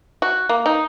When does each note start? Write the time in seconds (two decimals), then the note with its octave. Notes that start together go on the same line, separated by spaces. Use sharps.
0.22 F#4
0.49 A#3
0.66 D#4